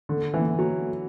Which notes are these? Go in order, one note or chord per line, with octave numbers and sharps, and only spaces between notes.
D3
E3
F#3